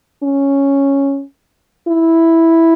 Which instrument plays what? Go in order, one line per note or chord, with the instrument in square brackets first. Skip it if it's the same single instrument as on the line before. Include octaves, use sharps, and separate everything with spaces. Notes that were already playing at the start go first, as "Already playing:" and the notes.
[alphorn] C#4
E4